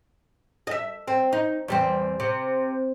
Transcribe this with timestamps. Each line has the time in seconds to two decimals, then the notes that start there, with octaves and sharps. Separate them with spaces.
0.67 D#5 E5
1.08 C4
1.33 D#4
1.68 E2 G3 C4
2.20 C3